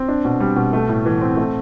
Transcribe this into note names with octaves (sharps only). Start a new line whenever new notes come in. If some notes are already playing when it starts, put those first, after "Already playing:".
Already playing: C4
D4
B2
G3
B2
A3
A2
E3
C4
A3